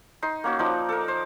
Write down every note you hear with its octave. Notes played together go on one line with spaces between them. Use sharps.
D#4 C6
A#3 C#4 F#4
F3 D#4 D5
A4 A#4
C5